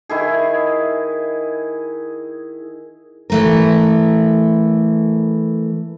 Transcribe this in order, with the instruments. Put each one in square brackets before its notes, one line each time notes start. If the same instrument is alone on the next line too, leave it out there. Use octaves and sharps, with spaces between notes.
[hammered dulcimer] D#3 E4 G#4
[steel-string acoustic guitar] E3 A3 A#4